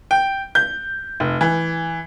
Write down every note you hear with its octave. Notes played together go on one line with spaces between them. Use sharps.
G5
G6
F1
E3